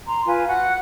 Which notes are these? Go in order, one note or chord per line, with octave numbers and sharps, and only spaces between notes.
A#5 C6
F4 B4 G#5
F#4 F#5 F#6